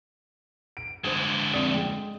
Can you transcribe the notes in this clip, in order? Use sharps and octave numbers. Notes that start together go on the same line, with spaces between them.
D7
D3 G#3 C5 D#6
F2 D5 D#6
G#3 G5